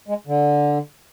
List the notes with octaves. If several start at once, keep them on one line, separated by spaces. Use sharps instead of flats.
G#3
D3